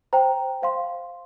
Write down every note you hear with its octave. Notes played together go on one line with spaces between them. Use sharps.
C5 G5 A#5
C5 F5 C6